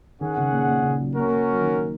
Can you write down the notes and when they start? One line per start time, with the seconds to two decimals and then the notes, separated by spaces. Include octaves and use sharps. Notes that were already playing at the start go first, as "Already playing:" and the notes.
0.21 D#3 C#4 G#4 F#5
0.37 C#3
0.52 A#2
0.68 A#2
0.83 C#3
1.00 F#3
1.15 A#3 C#4 F#4 A#4
1.27 A#3
1.50 F#3
1.61 D#3